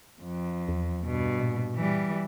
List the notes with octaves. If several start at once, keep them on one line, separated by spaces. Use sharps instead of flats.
F2
E2
G2 B2
A#2
E3 G3